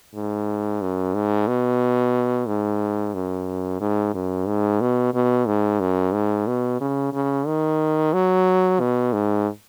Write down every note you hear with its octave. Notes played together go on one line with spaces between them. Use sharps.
G#2
F#2
G#2
B2
G#2
F#2
G#2
F#2
G#2
B2
B2
G#2
F#2
G#2
B2
C#3
C#3
D#3
F#3
B2
G#2